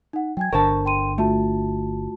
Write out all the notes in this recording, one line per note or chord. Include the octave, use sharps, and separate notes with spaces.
D#4 F#5
F#3 G5 G#5 G#6
G1 D3 A#4 C5 A5 C#6
G5 C6 D#7
A3 F4 F#4 A5